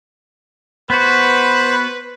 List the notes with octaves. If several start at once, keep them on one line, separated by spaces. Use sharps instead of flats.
B3 F#4 B4 C5 B5